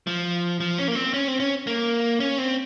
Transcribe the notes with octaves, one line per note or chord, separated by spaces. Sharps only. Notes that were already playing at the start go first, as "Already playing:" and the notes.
F3
F3
C#4
A#3
C4
C#4
C4
C#4
A#3
C#4
C4